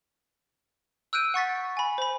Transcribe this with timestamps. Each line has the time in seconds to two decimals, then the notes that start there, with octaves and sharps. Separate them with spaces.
1.13 E6 F#6 G6 D7 D#7
1.34 F#5 C#6 A6 B6
1.77 G#5 B5
1.98 C5 B5